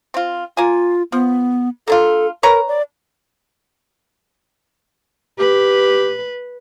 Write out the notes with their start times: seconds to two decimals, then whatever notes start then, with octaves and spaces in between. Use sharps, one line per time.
0.14 C4 F4
0.57 A#3 F4 G#5
1.12 F3 B3
1.88 A#3 D4 F4 A4
2.43 A#4 B4 C#5 A#5
2.68 D5
5.39 G4 B4